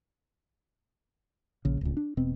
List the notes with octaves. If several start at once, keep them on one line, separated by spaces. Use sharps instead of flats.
A#1 C#3
D1 C#2
D4
E1 B2 C4